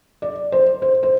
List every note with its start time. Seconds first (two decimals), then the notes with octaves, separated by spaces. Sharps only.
0.22 D5
0.52 C5
0.82 C5
1.03 C5